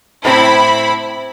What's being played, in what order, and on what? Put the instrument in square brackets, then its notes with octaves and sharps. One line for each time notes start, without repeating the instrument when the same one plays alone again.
[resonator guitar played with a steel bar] A2 C4 [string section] E4 B5